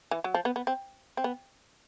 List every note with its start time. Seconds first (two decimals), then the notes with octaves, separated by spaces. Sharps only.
0.11 E3
0.24 F#3
0.34 F3
0.45 B3
0.56 B3
0.67 C4
1.17 C4
1.24 B3